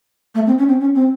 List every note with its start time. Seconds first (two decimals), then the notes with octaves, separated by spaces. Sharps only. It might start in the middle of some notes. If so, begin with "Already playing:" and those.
0.35 A3
0.47 C4
0.58 C#4
0.68 C4
0.80 C#4
0.95 C4